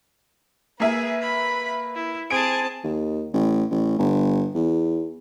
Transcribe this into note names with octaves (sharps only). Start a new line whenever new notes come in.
A#3 G#4 B4 E5
B5
E4
C4 G#4 A5 D7
D#2
A1
A1
G1
E2